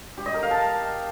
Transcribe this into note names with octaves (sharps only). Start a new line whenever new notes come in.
G4
D#5
A#4
F5
A5